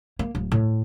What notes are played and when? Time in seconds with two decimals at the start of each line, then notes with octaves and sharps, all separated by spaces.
0.19 A#3
0.35 D1
0.52 A2